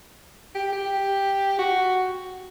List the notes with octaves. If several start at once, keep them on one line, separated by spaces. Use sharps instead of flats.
G4
G4
F#4